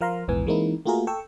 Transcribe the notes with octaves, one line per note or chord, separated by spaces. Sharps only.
F3 A#4 F5 A#5 C6
A#1 E2 G#2 E3 B3 G#5
E3 G#3 A#3 C4 D#4 E4
A3 A#3 F4 F#4 G#4 A#4
A4 G5 C#6 E6